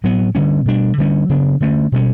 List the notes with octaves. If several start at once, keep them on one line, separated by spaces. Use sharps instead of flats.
A2 F#3 B3
D3 G3 C#4
B2 G3 D4
D3 G3 C#4
C#3 F#3 B3 D4
D3 A3 C#4
B2 G3 C#4